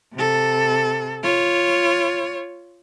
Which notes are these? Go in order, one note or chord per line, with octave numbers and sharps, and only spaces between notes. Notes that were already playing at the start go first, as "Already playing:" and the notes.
C3 A4
F4 C#5